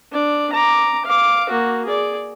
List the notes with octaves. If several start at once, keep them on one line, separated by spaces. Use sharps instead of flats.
D4 D5
A#5 D6
F5 D6
A#3 F#4
G#4 D5